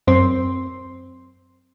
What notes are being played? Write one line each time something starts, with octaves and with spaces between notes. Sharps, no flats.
F#2 C4 C6